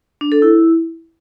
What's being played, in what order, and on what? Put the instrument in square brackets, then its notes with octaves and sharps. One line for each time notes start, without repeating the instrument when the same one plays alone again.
[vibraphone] D4
A4
E4